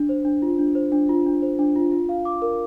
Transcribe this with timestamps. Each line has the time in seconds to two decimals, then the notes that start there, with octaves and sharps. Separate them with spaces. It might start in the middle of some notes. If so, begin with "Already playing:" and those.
Already playing: D4
0.09 C5
0.25 D4
0.42 F4
0.59 D4
0.75 C5
0.92 D4
1.09 F4
1.26 D4
1.42 C5
1.59 D4
1.76 F4
1.92 F4
2.09 F5
2.25 D6
2.42 A#4